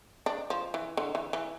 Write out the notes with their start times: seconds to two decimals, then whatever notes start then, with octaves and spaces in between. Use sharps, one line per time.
0.26 D4
0.50 F3
0.74 E3
0.97 D3
1.15 E3
1.33 E3